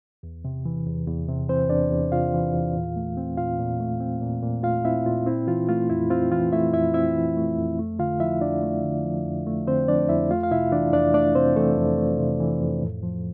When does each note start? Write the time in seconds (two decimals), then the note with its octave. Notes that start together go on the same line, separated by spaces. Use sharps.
0.23 E2
0.45 C3
0.65 E3
0.86 E2
1.08 E2
1.29 C3
1.49 E3 C4 C5
1.70 E2 D4 D5
1.91 E2
2.11 C3 F4 F5
2.33 E3
2.54 E2
2.74 A#2
2.96 A3
3.17 C4
3.37 A#2 F4 F5
3.59 A#2
3.80 A3
4.00 C4
4.22 A#2
4.43 A#2
4.63 A3 F4 F5
4.84 C4 E4 E5
5.06 A#2 F4
5.26 C4 E4
5.47 E3 F4
5.69 A3 F4
5.90 F2 E4
6.10 C4 F4
6.31 E3 F4
6.52 A3 E4 E5
6.73 F2 E4 E5
6.94 C4 E4 E5
7.16 E3
7.37 A3
7.57 F2
7.79 A3
7.99 D3 F4 F5
8.20 F3 E4 E5
8.41 F2 D4 D5
8.62 A3
8.84 D3
9.05 F3
9.25 F2
9.47 A3
9.67 D3 C4 C5
9.88 F3 D4 D5
10.09 F2 E4 E5
10.31 A3 F4 F5
10.43 F5
10.51 C3 E4 E5
10.72 E3 D4 D5
10.93 F2 D4 D5
11.14 A3 D4 D5
11.35 C3 C4 C5
11.56 E3 A3 A4
11.78 F2
11.98 A3
12.19 C3
12.40 E3
12.61 F2
12.82 A2
13.03 F3